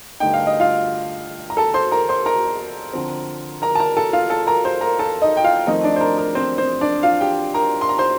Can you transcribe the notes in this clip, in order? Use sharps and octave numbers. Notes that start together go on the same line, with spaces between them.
G2 D3 A3 D#4 G5
F5
D#5
F4 F5
A#5
A4 A5
C5 C6
A#4 A#5
C5 C6
A#4 A#5
D3 F3 C4
A#4 A#5
A5
A#4 A#5
A4 A5
F4 F5
A4 A5
A#4 A#5
C5 C6
A#4 A#5
A4 A5
D#4 D#5
G5
F4 F5
F2 D#3 A3 C4 D#4 D#5
D4 D5
C5
A#4
A#4
C4 C5
C4 C5
D4 D5
F4 F5
G4 G5
A#4 A#5
C6
A#5
C5 C6